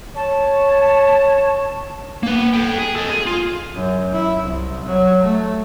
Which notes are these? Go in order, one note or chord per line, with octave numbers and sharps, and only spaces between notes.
C#5 A5
A#3 B4
A4 G5
G#4
A4 D#5
G#4
F4
F#2
E4
C2
F#3
A3